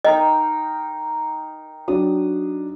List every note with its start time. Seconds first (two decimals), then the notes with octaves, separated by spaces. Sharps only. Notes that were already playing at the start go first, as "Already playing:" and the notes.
0.05 D#4 A#4 D#5 G5
1.88 F#3 D4 D#6